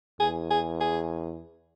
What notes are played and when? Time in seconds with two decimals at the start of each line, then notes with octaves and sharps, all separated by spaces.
0.20 E2 G#4
0.51 G#4
0.81 G#4